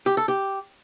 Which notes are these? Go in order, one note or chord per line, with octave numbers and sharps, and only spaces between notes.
G4
A4
G4